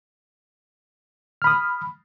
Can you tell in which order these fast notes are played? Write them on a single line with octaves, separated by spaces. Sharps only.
F6 B5 D#6